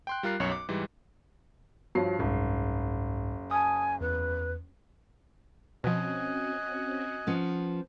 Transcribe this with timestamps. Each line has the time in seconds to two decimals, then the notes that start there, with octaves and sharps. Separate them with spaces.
0.07 G5 C6 F#6
0.23 G3 F4 A#4 F#6 C7
0.40 B1 F#2 C#5 C#7
0.52 D6
0.69 G#2 E3 G3
1.95 G2 F3 F#4 C#5 C7
2.19 F#1 C2 G#2
3.51 G#5 A5 D#6
4.01 E2 B4
5.84 B2 F3 C4 C#4 F#4 D#5 G#5 F#6
7.27 F3 B3 C#4